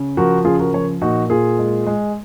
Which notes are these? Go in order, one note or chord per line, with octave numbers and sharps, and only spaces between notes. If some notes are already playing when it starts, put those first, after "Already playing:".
Already playing: C#3
F3 F#4 A#4
C#3 F4 G#4
F#4 A#4
F3 A#4 C#5
A#2 D#4 F#4
A#2 F4 G#4
G#3
G#3